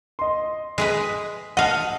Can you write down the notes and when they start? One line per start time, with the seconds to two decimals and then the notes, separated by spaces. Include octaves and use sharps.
0.19 D#5 C6
0.78 G#3 G#4 B4
1.57 D#5 F5 F#5 A5